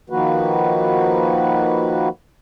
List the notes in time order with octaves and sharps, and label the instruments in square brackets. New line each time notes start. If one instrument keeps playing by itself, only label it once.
[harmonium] D#3 F3 A#3 F#4 B4